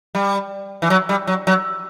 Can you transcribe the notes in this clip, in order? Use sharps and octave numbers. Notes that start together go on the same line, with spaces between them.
G3
E3
F#3
G3
F#3
F#3